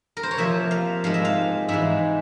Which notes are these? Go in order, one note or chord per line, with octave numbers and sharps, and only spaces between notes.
A#4
C5
C#5
C3 F3 A#3 E5
F5
G#2 F3 G#3 F5
E5
F5
G#2 E3 G#3 E5